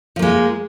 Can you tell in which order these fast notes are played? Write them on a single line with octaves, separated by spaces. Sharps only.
F3 A#3 G#3